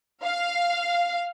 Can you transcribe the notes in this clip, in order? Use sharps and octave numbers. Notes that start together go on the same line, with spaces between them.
F5